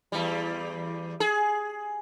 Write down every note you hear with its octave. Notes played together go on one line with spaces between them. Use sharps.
E2 G3
G#4